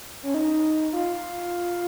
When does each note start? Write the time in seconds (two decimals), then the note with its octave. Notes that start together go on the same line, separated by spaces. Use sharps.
0.23 C#4
0.34 D#4
0.93 F4